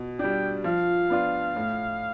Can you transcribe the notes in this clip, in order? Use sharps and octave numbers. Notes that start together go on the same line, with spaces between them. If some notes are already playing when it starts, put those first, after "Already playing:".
Already playing: B2
G3 D4 G5
F3 F5
B3 D4 F4
A2